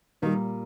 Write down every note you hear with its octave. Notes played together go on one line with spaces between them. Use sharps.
A#2 D#3 G3 D#4